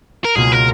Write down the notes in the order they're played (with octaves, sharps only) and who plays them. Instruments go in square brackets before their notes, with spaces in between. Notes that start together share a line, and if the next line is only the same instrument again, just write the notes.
[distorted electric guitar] A#4
[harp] C#2 B2 A#3 F4 [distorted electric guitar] G#4
[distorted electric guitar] A#4